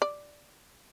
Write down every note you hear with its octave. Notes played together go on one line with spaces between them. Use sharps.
D5